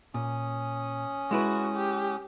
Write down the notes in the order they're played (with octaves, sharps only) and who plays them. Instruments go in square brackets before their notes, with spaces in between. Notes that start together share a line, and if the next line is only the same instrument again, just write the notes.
[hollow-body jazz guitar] A#2 [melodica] C#4 D#6
[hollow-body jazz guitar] G#3 E4 B4 [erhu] F#4
[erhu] G4